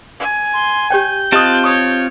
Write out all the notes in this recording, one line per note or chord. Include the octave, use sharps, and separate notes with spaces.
G#5
C6
G4 C#5 G5 G6
C4 F4 G4 D#5 A5 D#6 F#6
C#5 C#6 D#6